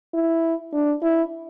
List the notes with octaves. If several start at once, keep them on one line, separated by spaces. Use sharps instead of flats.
E4
D4
E4